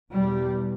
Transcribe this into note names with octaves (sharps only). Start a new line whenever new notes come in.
E2 B2 G3